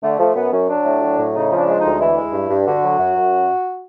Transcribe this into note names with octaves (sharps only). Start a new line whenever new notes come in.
D3 A3
F3 A3
F#2 B3
F#2 C#4
F#3 D4
A2
F#3
A2
C#3 D#4
F3
D4
G#3
D2 D#4
E3 E4
G#3
G2
G2
D3 F#4
F#3
F#2
F#2